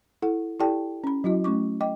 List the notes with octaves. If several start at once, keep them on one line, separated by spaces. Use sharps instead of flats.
E4 A4 F#5
E4 G4 A4 D5 G5 A5
C#4 B5
F#3 E4 F#4 D#5
A3 C#4 C#6 D6
D#5 G5 D6